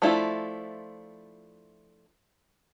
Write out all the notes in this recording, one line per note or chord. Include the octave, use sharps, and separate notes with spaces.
F3 A3 D4 E4 F4